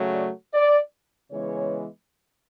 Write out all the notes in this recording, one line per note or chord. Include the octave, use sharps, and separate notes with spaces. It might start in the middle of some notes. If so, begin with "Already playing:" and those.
Already playing: C#3 F#3 A3
D5
D5
C#3 E3 G#3 B3 C#5